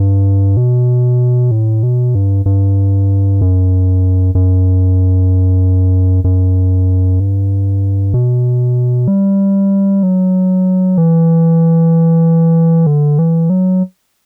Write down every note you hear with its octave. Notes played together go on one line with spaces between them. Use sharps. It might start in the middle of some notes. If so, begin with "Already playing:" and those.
Already playing: G2
B2
A2
B2
G2
G2
F#2
F#2
F#2
G2
B2
G3
F#3
E3
D3
E3
F#3